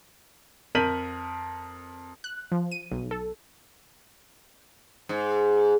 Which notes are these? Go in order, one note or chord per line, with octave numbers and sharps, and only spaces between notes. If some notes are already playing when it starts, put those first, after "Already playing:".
F2 A#4 G6 B6 D#7 F#7
F#6
F3
D#7
B1
A4
G#2